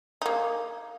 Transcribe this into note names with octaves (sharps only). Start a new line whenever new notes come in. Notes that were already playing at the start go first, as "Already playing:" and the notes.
A#3 D#4